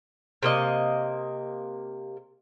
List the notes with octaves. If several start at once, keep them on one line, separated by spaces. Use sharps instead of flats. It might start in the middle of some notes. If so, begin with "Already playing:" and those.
C3 A#3 D#5